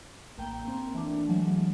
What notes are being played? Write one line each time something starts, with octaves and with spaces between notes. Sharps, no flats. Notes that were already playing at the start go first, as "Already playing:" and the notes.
A1 A#3 G5
A#3 C4
E3 A3 D4
E3 F#3 G#3 A3